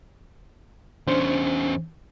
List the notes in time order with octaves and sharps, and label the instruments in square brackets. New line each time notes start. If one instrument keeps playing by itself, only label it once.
[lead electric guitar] E2 C#4 [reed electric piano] D4 C5